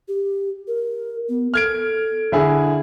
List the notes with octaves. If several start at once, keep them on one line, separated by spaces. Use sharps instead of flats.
G4
A#4
B3
A4 F6 G#6 D7
D3 E4 G#4